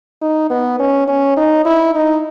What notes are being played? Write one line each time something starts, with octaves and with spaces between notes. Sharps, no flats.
D#4
B3
C#4
C#4
D#4
E4
D#4